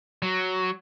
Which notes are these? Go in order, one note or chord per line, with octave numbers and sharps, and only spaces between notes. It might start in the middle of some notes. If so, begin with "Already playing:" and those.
F#3